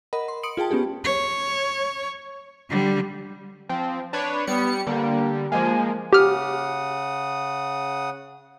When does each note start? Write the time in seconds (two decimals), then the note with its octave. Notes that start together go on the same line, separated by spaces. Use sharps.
0.13 A#4 D#5 F#5 B5
0.28 C6
0.43 C6 D#6 C#7 D7 F#7
0.57 F4 G#4 G5 A5
0.71 B3 C#4 G4 G#4
1.04 C#5
2.69 D3 G3
3.69 F3 C4
4.13 D4 B4 C#5
4.47 G3 B3 C#7
4.87 D3 G3 A#3
5.52 F3 G#3 A#3 G#5
6.13 C#3 G4 F#5 D#6 F6